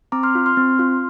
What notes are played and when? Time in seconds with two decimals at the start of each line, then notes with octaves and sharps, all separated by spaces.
0.12 C4 A#5 D6
0.23 C6 F6
0.35 F4
0.46 C6 F6
0.57 C4
0.79 F4